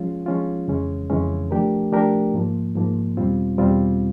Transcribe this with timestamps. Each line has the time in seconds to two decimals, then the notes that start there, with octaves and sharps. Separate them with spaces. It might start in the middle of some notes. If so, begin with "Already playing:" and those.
Already playing: F3 G#3 C#4 F4
0.26 F3 G#3 C#4 F4
0.68 F2 C#3 E3 G#3 C#4
1.10 F2 C#3 E3 G#3 C#4
1.51 F3 A3 D4 G4 A#4
1.92 F3 A3 D4 G4 A#4
2.34 G#2 F3 A#3
2.75 G#2 F3 A#3
3.17 E2 B2 G3 C4 F4
3.58 E2 B2 G3 C4 F4